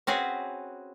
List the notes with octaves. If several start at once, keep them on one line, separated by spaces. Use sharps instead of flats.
C4 C#4 F#4 G#4 B4